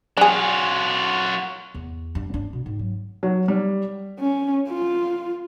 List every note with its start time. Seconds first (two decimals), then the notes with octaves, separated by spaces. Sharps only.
0.17 F#3 D4 F4 G#4
1.75 E2
2.15 G2
2.34 D4
2.53 B2
2.66 G#2
2.79 F#3
3.23 F#3
3.48 G3
4.20 C#4
4.69 F4